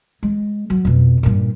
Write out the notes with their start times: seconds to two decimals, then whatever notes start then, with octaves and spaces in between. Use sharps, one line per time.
0.23 G#3
0.70 F#3
0.85 F2 B2
1.23 G2 A#2